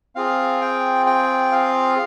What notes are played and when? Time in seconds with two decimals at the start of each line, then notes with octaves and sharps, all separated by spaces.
0.15 C4 F4 G#4 F5
0.61 G5
1.06 G5
1.52 F5